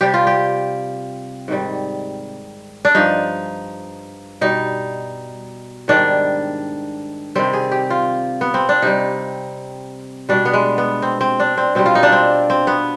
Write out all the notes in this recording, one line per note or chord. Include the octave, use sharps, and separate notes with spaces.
C3 G3 G4
F4
G4
G#2 D#3 G3
D4
G2 F3 D#4
B2 G3 D#4
G#2 D#3 G3 D4
C3 D#3 G3 C4
G#4
G4
F4
B3
C4
D4
C3 G3 D#4
B2 G3 D4
B3
G#3
B3
C4
C4
D4
C4
B2 G3 C4
F4
D#4
D4
C4
C4
B3